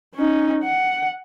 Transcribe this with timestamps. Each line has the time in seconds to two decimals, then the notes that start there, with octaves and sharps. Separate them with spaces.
0.16 C#4 D#4
0.64 F#5